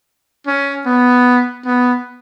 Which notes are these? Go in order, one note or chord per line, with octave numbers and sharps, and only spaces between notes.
C#4
B3
B3